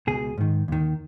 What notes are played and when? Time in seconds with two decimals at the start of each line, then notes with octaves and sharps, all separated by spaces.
0.07 C#2 B2 G#4
0.38 G#2 D#3
0.68 D#2 D#3